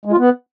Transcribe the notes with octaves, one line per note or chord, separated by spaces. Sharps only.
G#3
F4
B3